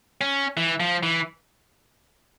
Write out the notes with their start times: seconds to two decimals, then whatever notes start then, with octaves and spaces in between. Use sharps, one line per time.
0.21 C#4
0.57 E3
0.80 F3
1.03 E3